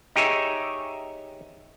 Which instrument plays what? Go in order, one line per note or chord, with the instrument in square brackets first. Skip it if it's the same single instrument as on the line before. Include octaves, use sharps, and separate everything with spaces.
[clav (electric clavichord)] D#4 G4 G#4 C#5 E5